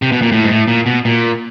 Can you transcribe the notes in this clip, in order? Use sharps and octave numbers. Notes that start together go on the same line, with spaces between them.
C3
B2
A#2
A2
G#2
A2
A#2
B2
A#2